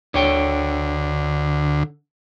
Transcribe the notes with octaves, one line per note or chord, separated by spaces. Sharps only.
D2 D3 C#5 G5